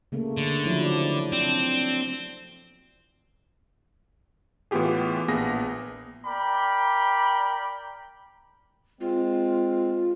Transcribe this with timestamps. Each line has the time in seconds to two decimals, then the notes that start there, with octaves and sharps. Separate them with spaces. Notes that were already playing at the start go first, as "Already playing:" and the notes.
0.12 C#3 A3 A#3
0.37 D3
0.65 F3 F#3 E4
0.84 D5
1.32 C4 D4
4.71 A2 E3 B3 F4 G4 G#4
5.28 A#1 A#3 B3 G#4 A#6
6.26 A#4 D5 G5 B5
9.01 G#3 C4 F4